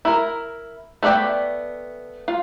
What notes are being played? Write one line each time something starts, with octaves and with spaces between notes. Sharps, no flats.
E4 A#4
A3 B3 D5 E5 G5
F4